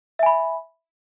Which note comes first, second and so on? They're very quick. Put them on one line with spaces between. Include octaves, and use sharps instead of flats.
E5 G#5 B5